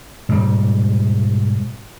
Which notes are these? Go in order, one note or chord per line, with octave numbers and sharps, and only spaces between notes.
G#2 B2 G3